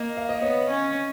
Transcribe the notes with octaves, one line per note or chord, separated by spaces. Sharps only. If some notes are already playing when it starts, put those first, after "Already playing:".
Already playing: A#3 D#5
F5
D#5
B3 C#5
C#4